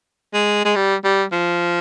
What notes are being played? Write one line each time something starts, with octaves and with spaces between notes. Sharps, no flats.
G#3
G#3
G3
G3
F3